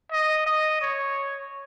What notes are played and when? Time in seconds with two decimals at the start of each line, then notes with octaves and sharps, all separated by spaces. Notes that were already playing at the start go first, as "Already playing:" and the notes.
0.12 D#5
0.46 D#5
0.82 C#5